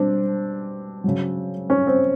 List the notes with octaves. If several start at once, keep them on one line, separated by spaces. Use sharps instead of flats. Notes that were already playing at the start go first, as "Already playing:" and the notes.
Already playing: B2 G3 C4 D4
C#3 F#3
C#4
C4